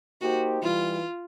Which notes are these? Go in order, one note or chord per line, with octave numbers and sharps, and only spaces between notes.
A#3 D#4 F#4 G4 C5
E3 G3 F4